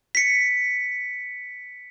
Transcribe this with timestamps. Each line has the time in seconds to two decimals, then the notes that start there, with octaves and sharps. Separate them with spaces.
0.15 B6 C#7